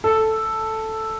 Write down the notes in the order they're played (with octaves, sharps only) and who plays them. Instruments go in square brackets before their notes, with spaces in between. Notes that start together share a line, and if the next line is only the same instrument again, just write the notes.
[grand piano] A4